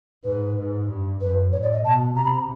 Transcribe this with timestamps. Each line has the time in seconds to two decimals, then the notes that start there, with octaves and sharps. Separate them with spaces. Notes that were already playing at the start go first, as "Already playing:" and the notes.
0.24 G#2 B4
0.56 G#2
0.88 G2
1.20 F#2 B4
1.52 A2 C#5
1.62 D5
1.73 D#5
1.84 B2 A5
2.15 C3 A#5
2.25 B5
2.32 A#5